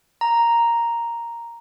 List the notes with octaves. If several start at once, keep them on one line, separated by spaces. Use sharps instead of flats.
A#5